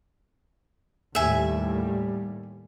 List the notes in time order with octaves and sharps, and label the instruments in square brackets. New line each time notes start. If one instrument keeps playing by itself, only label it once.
[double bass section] D#2 A2 G3 [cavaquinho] E5 G#5